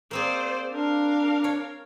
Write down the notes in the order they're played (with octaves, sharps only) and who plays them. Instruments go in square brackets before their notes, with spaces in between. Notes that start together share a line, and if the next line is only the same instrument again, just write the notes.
[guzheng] A#3 C4 G#4 [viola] C5 D5
[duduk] D4 [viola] A#4 F5
[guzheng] C#5